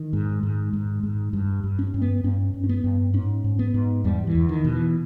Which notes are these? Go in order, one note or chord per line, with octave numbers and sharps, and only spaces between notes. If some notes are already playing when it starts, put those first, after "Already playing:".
Already playing: D#3
G#2
G#2
G#2
G#2
G2
G2
C#4
G2
B3
G2 C#4
G2
C#4
B3
G2
G#2 C#4
G#2
B3
G#2
E2 G3
E3
E2
D#3
B2
E3